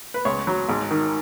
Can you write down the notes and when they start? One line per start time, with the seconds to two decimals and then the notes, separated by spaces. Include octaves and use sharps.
0.14 B4
0.25 C#2 C#5
0.47 F#3
0.69 G#1
0.91 D#3